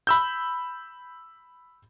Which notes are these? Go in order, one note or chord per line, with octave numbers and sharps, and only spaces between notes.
B5 E6 G6